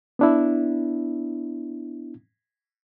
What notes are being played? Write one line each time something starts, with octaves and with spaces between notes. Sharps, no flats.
B3 D4 E4